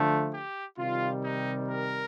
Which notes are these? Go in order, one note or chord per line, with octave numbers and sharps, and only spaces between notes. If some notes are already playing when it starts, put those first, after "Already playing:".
Already playing: D3 F3 A3
G4
C3 D#3 G3 F4
D#4
A#4